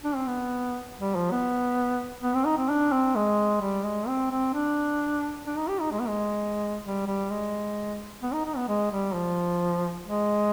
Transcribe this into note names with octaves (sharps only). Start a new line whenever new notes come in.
D4
C4
B3
G3
F3
B3
B3
C4
D#4
C4
D4
C4
G#3
G3
G#3
C4
C4
D4
D4
D#4
G4
D#4
G#3
B3
G#3
G3
G3
G#3
B3
D#4
D#4
B3
G#3
G3
F3
G#3